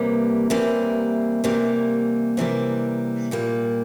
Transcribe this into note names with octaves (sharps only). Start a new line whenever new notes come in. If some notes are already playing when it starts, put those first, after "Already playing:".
Already playing: C3 E3 G3 A#3
C3 E3 G3 A#3
C3 E3 G3 A#3
C3 E3 G3 A#3
A#2 G3 A#3